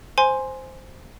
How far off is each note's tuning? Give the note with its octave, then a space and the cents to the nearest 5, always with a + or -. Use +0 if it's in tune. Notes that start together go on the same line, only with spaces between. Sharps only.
C5 +0 G#5 +0 C6 +0